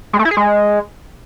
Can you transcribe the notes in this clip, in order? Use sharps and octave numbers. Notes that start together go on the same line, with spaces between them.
G#3
A3
E4
G#4
G#3